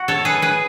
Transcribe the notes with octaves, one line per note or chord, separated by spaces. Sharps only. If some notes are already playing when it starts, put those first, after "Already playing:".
Already playing: F#4
A4 C#5
G#4 B4
G#4 B4